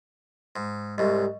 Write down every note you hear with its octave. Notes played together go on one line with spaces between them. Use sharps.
G#2
C2 G#2 G3 D#5 E5 C#6